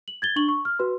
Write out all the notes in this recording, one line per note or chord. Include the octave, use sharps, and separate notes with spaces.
F#7
G#6 A6 G7
D4 C#6 F#7 G7
C#6
F6
F#4 B4 C6